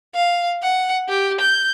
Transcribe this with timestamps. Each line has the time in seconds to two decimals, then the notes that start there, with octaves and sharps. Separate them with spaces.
0.14 F5
0.63 F#5
1.09 G4
1.41 G6